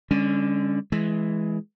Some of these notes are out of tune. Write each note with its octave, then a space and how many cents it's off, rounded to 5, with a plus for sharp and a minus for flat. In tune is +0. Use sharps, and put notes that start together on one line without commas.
D3 -5 G#3 -40 C#4 +0
E3 +0 G#3 +15